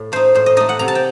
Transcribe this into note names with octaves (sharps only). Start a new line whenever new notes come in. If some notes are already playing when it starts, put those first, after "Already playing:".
Already playing: A2
A3 D#4 C5
A2 C5
D#5
A3 D#4 D#5
F#5
C3 A#5
A5
G5